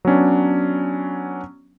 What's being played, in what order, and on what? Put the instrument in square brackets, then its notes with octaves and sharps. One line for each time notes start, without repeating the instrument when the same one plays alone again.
[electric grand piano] F#3 B3 C#4 D4